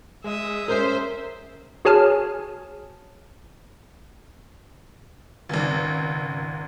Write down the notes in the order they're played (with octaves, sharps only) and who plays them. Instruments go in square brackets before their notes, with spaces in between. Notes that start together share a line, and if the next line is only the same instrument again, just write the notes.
[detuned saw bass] G#3 [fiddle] E5 D#6
[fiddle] C#4 [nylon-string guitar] A#4 [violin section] C5 E5
[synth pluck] F#4 G#4 C#5 G#5 A5 F6
[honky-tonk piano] G#1 C#2